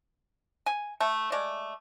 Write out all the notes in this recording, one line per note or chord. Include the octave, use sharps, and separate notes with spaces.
G#5
A3 A4
G#3 A3 D5